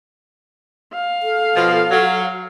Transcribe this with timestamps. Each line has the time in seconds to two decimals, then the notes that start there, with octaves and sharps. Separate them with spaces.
0.94 F5
1.23 A4
1.56 B2 F3
1.91 F#3